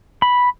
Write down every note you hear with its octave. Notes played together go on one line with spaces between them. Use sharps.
B5